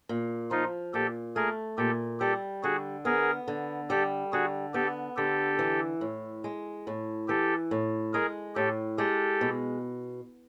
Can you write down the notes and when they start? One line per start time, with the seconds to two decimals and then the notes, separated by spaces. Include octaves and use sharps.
0.09 A#2
0.51 F3 D#4 F4
0.94 A#2 G4 A4
1.35 A3 G#4 A#4
1.78 A#2 G4 A4
2.20 G3 G4 A4
2.63 D3 F#4 G#4
3.05 B3 G#4 A#4
3.48 D3
3.90 G3 G4 A4
4.32 D3 F#4 G#4
4.74 B3 G4 A4
5.17 D3 G4 A4
5.59 E3
6.01 A2
6.44 G#3
6.87 A2
7.28 E3 G4 A4
7.71 A2
8.13 G#3 G#4 A#4
8.56 A2 G4 A4
8.98 G#3 G4 A4
9.41 B2